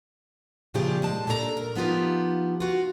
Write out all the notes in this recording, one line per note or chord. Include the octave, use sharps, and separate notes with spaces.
A#2 C#3 E3 F3 G4 G#4
D#2 G#3 A5
A#2 D4 A4 B4 A#5
A#4
F3 B3 D#4 F4 G4
F4 F#4